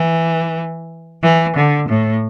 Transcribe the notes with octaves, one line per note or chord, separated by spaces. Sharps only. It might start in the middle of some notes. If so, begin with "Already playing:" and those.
Already playing: E3
E3
D3
A2